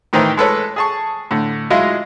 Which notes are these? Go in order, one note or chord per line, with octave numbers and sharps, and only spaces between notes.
A2 D#3 E3 D#4 C5 G5
G#3 A4 B4 C#5
G#4 A5 C#6
A2 D3
F#3 G#3 E4 F4 D#5 F5